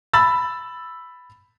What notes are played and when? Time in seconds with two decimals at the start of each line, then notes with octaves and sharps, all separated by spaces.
0.13 B5 E6 A6